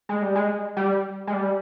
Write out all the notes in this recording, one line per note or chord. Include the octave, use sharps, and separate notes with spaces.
G#3
G3
G#3
G3
G#3
G3